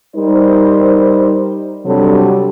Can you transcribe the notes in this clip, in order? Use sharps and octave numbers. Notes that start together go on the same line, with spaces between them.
G3 D#4 A#4 C5
C3 F#3 G3 D4 A4